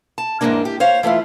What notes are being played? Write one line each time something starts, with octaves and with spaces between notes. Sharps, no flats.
A5
E2 G#2 D3 G#3 A#3 D4
G4
C5 C#5 F5
E3 A3 E4 F4